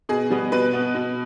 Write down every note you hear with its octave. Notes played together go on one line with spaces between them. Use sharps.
B2 G#4
G3 B3
B2 B4
B3
B2